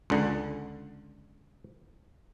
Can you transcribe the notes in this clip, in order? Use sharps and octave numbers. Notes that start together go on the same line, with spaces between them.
C#2 D3